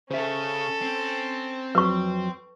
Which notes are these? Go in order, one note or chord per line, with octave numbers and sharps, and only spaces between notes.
C#3 C#4 A4 C5 E5
C4
F2 F#3 B4 C#6